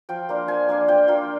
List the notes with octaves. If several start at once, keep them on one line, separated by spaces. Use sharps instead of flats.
F3 G5
A#3 D4 F4
F3 G#5
A#3 D4 F4
F3 G5
A#3 D4 F4